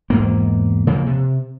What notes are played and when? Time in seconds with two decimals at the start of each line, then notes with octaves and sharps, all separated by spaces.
0.10 E2 G#2 A#3
0.87 C#3 F3 A#3
1.07 C3